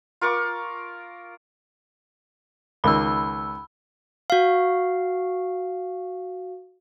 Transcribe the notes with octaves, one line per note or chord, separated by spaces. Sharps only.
F4 A#4 C#6 D6
C#2 D#3 B5 E6
F#4 F5